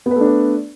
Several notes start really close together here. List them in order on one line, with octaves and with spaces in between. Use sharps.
B3 B4 A3 D4 D5